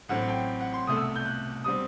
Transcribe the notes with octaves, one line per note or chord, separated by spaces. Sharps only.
A1 A2 F#3 C4 F#5
G5
F#5
C6
C2 B2 A3 D#6
E6
G6
F#6
B2 G3 C4 D#6